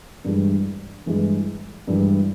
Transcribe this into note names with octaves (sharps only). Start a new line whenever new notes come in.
G2 E3 G#3
G2 E3 G#3
G2 E3 G#3